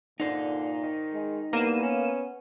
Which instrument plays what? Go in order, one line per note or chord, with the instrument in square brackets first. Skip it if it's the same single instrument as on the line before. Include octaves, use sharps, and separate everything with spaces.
[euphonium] A#2 [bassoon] D3 [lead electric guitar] D#4 C5
[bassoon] D#3
[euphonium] G#3
[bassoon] C2 [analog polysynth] A#3 D#7 E7 [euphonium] B3
[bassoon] C#4